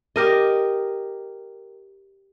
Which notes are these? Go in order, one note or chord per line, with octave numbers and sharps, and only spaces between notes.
G4 A#4 D#5